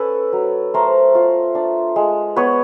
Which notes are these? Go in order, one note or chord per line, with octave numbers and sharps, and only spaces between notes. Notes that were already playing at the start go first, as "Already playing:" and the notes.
Already playing: C#4 A4 B4
F#3
A3 A#4 C5
F4
D4
G#3
B3 B4 C#5